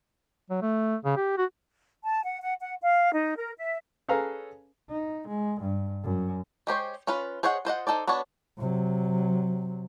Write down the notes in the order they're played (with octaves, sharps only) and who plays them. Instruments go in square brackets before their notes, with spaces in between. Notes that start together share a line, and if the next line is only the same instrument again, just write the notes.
[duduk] F#3
A3
C#3
G4
F#4
[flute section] A5
F#5
F#5
F#5
F5
D#4
A#4
E5
[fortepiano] C#4 G#4 A4 B4 F5 A#5
[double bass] D#4
G#3
G2
F#2
[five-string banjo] G#3 G4 C5 C#5
C#4 F4 B4
G#4 C5 C#5 D#5 F#5
F4 C5 D#5 F#5
D#4 A4 C5 D5
B3 D4 F#4 C#5 A5
[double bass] C3 F#3